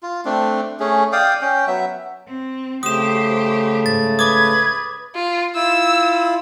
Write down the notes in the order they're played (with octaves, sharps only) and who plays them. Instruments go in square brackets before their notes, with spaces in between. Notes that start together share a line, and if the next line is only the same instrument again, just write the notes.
[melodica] F4
A3 C4 D4
A3 C#4 G#4
D5 F5 G5 D#6
C#4 G5
F#3 B3 E5
[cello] C4
[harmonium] C#3 A3 [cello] G4 C5 [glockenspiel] D#6 E7
[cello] G#2 [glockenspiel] A6
[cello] B4 [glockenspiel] D6 D#6 [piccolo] G#6
[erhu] F4
[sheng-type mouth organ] E4 F4 [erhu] E6